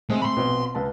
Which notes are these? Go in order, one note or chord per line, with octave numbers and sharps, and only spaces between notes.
G#3 A3 C4
B5 C6
A#1 B2 C4
C#2 B4 A5